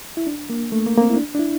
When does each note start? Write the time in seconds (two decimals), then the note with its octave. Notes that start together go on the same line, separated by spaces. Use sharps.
0.17 E4
0.27 D4
0.50 A#3
0.72 A3
0.87 A#3
0.98 A#3
1.01 C4
1.10 E4
1.16 D4
1.35 D4
1.39 E4